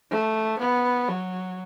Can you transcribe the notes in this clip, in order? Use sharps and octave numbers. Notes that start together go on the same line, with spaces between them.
A3
B3
F#3